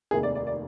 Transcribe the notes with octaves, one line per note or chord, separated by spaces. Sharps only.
F1 D#2 D#3 G#4
D5
D5
D5